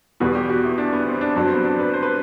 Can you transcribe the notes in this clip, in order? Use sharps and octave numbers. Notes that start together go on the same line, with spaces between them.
E2 B2 G3 B4
G4
F#4
E4
D4
B3
C4
D4
G2 F#3 D4
C4
B3
D4
B4
C5
B4